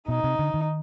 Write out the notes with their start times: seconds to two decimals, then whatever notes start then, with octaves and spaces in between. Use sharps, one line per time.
0.08 B2 D#4
0.24 C3
0.39 D3
0.54 D#3